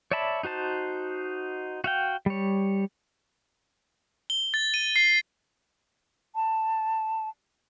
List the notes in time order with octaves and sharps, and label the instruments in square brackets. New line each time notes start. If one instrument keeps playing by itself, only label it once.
[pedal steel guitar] C#5 D5 E5 A5 B5
D#4 F#4 C5 A5
F#4 F5 G5
G3 C#5
[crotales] G7
A6
D#7
C7
[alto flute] A5